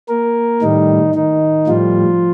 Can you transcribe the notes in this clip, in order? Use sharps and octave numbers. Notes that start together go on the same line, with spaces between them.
A#3 A#4
A2 D#3 G3 D#4
D#3 D#4
A2 F3 G3 F4